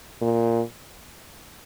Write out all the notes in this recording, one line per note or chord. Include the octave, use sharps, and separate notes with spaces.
A#2